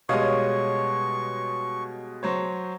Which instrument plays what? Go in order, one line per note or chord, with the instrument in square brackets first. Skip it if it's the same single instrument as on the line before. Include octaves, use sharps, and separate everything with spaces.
[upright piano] B2 G3 G#3 [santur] C#5 D#6 [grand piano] D#5 F5 [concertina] C#6
[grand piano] F#3 C5 C#5